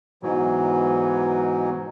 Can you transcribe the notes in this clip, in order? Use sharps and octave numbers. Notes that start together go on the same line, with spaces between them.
G#2 B2 E3 F#3